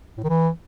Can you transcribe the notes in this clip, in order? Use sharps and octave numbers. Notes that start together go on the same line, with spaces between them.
A2
D#3
E3